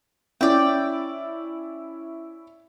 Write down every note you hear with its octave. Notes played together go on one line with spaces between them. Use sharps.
C#4 E4 D5 G5